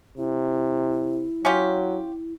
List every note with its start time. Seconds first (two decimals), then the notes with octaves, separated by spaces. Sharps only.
0.18 C3 E4
1.45 F#3 C#4 F4 G4